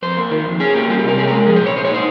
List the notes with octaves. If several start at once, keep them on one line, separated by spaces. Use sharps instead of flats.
F2 C5
A#3
D#3
F2
C#4 G#4
A#3 G4
G3 F4
G4
C3 A#4
C#4 G#4
A#4
G#3
F3 G#4
C5
A#2
C#5
A#2 C5
C#5
D#4 C5